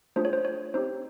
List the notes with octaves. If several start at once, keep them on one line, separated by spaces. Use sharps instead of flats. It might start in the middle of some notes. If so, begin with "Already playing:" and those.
A3 D4 F4 G#4 C5
C#5
C5
C#5
C4 D#4 G4 C5